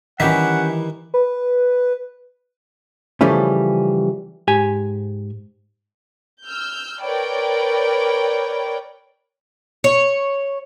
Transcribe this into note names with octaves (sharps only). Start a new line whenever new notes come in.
D#3 E3 G3 C#4 G4 B4 E5 F#5
B4
C#3 E3 F3 G3 A3 C#4
G#2 G4 G#5
E6 F6 G6
A#4 B4 C#5 D5 G5
C#5